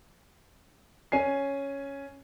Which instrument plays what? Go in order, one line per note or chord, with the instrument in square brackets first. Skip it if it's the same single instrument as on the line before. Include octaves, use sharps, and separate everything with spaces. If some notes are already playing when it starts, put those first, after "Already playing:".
[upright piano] C#4 G#5 C7